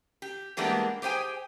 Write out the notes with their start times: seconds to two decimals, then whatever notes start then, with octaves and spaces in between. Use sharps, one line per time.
0.22 G4
0.57 E3 G3 G#3 A#3 B3 D4
1.02 G4 G#4 C5 G5 G#5